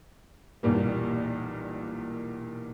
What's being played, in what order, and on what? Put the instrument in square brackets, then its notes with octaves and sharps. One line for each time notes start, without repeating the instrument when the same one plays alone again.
[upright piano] B1 E2 A#2 G3 A#3